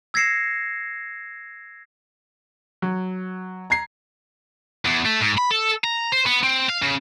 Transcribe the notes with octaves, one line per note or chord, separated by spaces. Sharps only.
E6 G#6 A#6 C7 C#7 E7
F#3
A#5 G#6 C7
E2
A3
G#2
B5
A4
A#5
C5
B3
C4
F5
C#3